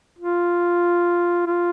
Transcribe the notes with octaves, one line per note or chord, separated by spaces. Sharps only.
F4
F4